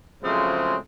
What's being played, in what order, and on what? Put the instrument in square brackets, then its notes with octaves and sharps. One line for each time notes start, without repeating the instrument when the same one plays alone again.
[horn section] C#3 F3 F#3 G#3 A3 C4